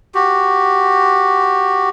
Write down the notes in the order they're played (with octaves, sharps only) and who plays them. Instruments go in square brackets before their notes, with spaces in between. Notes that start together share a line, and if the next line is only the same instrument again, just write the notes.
[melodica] F#4 G4